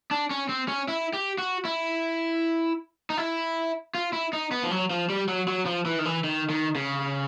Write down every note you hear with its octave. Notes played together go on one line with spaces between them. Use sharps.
D4
C#4
C4
C#4
E4
G4
F#4
E4
D#4
E4
F4
E4
D#4
B3
F3
F#3
F3
G3
F#3
F#3
F3
E3
D#3
E3
D#3
D#3
C#3